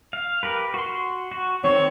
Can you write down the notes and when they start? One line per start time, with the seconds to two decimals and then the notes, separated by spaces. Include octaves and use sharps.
0.13 F5
0.43 G4 A#4 B4
0.74 F#4 C6
1.32 F#4
1.64 D#3 C4 C#5